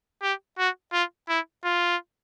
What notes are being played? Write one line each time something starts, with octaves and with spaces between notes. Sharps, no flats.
G4
F#4
F4
E4
F4